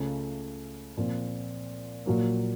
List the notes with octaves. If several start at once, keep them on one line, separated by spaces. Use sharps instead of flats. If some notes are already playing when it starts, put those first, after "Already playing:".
Already playing: C#2 C#3 A3
A#2 F3 C4
A#1 A#2 F#3 A#3